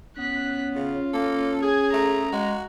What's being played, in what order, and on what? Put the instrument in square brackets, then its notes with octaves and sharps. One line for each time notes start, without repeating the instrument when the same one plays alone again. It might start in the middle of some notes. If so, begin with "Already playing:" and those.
[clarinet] B3 [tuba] C#4 [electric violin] F#6 B6
[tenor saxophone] C#3 [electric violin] F4
[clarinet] A#3 [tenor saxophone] A4
[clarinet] G#4 [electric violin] G#5
[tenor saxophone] A3 [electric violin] A#5
[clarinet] G#3 [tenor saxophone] F#4